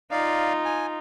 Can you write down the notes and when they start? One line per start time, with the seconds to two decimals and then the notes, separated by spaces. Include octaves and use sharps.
0.11 D#4 F4 D5 F5
0.65 G#5